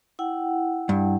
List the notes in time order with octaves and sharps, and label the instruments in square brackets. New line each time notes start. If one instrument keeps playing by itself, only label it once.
[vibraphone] E4 F#5 G5
[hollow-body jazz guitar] G2